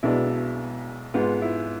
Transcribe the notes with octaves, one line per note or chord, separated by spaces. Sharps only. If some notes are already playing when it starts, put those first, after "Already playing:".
B1 B2 G#3 B3 D4 E4
G#2 G#3 B3 F4
E4